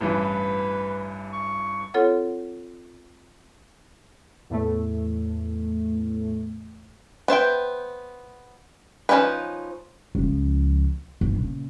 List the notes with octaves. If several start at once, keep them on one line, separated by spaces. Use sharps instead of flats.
A1 G2 E3 B4
C#6
C4 F4 A4 C#5 F#5
E2 A2 A3
B3 C5 E5 G5
F3 G3 C#4 D#4 B4
C#2 F3
G1
A#2 C#3